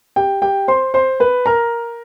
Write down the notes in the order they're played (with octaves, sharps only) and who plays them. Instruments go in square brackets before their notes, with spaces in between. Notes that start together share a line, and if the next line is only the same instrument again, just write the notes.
[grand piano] G4 G5
G4 G5
C5 C6
C5 C6
B4 B5
A#4 A#5